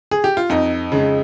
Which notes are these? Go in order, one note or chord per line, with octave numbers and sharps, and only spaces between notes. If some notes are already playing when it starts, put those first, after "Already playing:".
G#4
G4
F4
F2 D#4
C#3 G#3